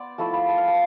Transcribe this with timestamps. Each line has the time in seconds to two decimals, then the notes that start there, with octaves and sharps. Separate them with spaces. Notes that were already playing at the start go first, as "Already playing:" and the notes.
Already playing: B3 C5 D5
0.18 F3 A3 E4 A5
0.33 B5
0.48 A5
0.58 F5
0.68 A5